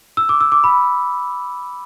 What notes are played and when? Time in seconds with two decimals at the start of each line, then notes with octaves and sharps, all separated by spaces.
0.17 E6
0.29 D6
0.41 E6
0.52 D6
0.64 B5